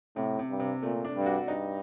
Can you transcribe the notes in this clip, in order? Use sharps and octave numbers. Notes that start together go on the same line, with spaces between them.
A2 C3
C3
G2
C3
A#2 A3
D4
G2
F#4
G2 D#4